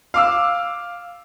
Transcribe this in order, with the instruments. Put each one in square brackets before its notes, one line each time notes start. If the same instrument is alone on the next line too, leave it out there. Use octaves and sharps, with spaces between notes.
[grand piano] F5 D6 E6